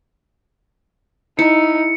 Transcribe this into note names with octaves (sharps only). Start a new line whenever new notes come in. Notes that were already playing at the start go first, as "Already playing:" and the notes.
D#4 E4 C#7